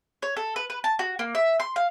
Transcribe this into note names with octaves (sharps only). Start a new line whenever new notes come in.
C#5
A4
B4
B4
A5
F#4
A#3
E5
C6
F5